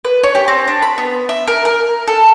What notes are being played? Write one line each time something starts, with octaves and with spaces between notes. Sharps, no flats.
B4
C#5
G4
C4
D4
B5
B3
E5
A#4
A#4
A4